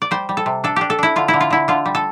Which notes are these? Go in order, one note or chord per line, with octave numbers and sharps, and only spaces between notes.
D5
G3 C5
G3
A4
C3
D4 A4
D4 G4
A4
D4 E4
D3 F4
E4
D3
F4
D3 E4
D3 F4
G3
A4